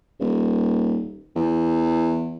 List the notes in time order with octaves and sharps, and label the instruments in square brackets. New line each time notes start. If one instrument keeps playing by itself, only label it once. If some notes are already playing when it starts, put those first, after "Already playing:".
[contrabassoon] D#1
E2